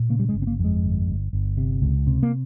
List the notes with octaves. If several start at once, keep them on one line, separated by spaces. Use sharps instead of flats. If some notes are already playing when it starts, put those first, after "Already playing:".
Already playing: A#2
C#3 A#3
G3
G#3
G1
C4
A#3
F2
G#3
G1
G1
G1
C3
C#2
C3
A#3